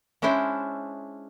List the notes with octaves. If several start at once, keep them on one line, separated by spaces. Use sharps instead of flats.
G#3 C#4 D4 E4 C5 E5